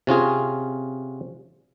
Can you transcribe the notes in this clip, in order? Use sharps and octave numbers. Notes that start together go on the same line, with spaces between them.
C3 C#4 F4 G#4